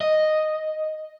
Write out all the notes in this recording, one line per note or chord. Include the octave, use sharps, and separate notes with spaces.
D#5